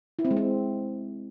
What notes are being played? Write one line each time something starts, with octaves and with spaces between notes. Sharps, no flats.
E4
C4
G#3
C4